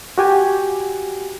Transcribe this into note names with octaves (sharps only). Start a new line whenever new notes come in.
F#4 G4 G#5